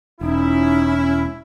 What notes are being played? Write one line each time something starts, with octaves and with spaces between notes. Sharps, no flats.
E1 C#4 D#4 E4